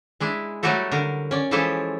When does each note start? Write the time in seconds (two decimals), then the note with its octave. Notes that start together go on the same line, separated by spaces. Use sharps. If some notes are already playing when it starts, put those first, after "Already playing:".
0.20 G#3 D4 E4
0.63 F#3 G3 A3 F#4 G4 A4
0.92 D3 A#4
1.31 C#4 D5
1.51 E3 F3 G#3 E4 G4 A4